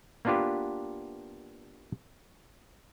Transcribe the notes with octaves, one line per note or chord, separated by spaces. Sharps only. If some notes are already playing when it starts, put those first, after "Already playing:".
A#3 B3 D4 F4 G4 B4